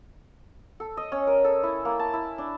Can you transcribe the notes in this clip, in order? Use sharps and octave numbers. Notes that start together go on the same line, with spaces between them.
A4
D#5
C#4
A#4
A4
E4
A#3
A5
E4
D4